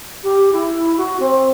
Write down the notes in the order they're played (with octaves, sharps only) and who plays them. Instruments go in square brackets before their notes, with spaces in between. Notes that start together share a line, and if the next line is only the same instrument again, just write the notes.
[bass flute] G4
E4
F#4
C4